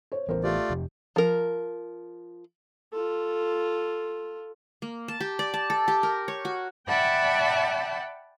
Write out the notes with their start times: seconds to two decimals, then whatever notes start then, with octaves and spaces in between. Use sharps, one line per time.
0.12 C5 C#5
0.29 A1 E3 B3 A#4 C5
0.44 A3 F4 G4 D5
0.70 F2 C3 F3
1.16 F3 A#4
2.93 F4 A4
4.82 A#3
5.08 A5
5.20 G4
5.39 D5
5.54 A5
5.70 A4
5.88 G4
6.03 A#4
6.28 C#5
6.45 F#4
6.88 D5 E5 F#5 G5 A5 B5